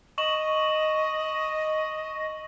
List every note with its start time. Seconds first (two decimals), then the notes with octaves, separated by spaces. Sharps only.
0.18 D#5 C#6 E7 F#7